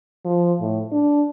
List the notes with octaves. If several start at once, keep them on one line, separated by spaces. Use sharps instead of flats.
F3
A2
D4